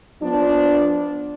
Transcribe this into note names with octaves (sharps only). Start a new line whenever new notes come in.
F3 B3 D4